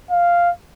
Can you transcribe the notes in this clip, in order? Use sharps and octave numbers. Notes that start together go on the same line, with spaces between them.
F5